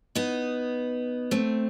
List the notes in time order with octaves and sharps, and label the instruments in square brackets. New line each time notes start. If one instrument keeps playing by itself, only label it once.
[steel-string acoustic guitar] B3 D#4
A3 C4